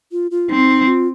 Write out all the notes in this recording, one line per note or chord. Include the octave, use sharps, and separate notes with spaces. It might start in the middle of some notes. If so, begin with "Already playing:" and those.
F4
F4
C4 D#4
F4